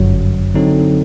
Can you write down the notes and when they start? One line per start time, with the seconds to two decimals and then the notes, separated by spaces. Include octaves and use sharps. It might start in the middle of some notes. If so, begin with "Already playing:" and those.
Already playing: G1 F#2 F#3
0.54 D3 F#3 C4 D#4 A4